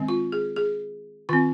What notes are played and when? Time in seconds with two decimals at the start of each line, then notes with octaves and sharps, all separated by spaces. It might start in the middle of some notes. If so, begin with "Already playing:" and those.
Already playing: D#3 G#3 C4
0.08 F4
0.32 G#4
0.56 G#4
1.29 D#3 C4 F4